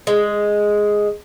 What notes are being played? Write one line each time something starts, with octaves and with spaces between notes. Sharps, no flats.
G#3